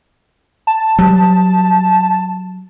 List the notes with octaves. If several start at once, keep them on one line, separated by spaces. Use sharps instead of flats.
A5
F#3 G3